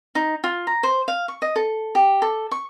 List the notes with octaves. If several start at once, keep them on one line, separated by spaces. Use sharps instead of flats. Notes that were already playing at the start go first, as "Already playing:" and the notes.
D#4
F4
A#5
C5
F5
C#6
D#5
A4
G4
A4
C#6